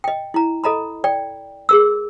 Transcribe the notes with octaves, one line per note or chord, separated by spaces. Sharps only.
D#5 G5
E4 A#5
A4 D#5 A#5 B5
D5 G5
G#4 A#4 E6